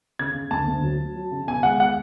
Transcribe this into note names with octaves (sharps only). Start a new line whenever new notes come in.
C#3 G#6
C#3
D2 A5
D2
F#3
F#3
F#3
C#3
B2 G#5
G#3 F#5
F#5